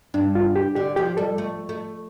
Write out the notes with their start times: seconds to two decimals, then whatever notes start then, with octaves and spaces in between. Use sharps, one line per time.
0.14 G2 D4
0.35 F4
0.56 G4
0.76 D3 G4
0.96 F3 G4
1.17 G3 A4
1.38 A3
1.69 A3